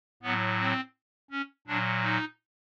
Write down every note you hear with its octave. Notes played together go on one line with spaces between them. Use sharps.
A2 F#3 B3
C4
C#4
A#2 F#3 D4
D#4